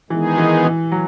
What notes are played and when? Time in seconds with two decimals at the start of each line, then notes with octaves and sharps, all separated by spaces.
0.10 D#3 E3 G#3 B3 D#4 G#4
0.38 E3
0.64 E3
0.92 F#3